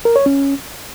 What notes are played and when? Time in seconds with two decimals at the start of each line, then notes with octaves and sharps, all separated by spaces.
0.05 A#4
0.16 C#5
0.26 C#4